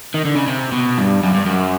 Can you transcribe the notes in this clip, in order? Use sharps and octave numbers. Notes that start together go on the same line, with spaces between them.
D#3
D3
C#3
C3
B2
G2
F#2
G2
F#2